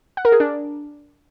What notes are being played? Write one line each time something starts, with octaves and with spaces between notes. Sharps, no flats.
F#5
A#4
G#4
D4